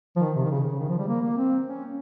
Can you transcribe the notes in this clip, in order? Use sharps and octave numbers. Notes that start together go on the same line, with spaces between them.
F3
D#3
C3
D#3
C#3
C#3
D#3
F3
G3
A#3
A#3
C4
C#4